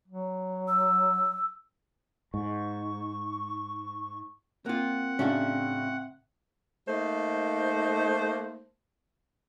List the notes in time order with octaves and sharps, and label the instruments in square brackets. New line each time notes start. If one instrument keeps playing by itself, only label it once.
[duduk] F#3
[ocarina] E6
[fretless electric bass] G#2 [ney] C#6
[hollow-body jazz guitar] A#3 F4 [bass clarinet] C4 [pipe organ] F#5
[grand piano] A2 C#3 [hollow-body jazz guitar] C#4 D4 F#4
[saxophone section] A3 A#3 D#4 C5